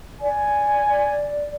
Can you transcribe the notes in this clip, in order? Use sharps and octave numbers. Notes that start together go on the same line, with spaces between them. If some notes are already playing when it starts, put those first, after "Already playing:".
D5 G#5